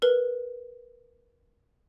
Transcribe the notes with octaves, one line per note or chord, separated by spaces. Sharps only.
A#4 B4